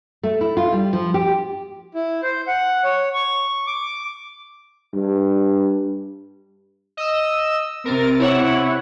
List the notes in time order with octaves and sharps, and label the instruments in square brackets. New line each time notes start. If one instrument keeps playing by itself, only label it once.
[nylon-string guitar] A3
E4
F4
G3
F3
G4
[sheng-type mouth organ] E4
C5
F#5
C#5
C#6
D6
[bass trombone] G2
[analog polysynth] D#5 E6
[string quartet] C3 [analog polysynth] A#4 A6
[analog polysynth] E4 C#5 F#5